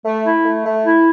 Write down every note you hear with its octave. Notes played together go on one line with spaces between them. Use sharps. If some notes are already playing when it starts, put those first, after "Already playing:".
A3
E4
A3
A3
E4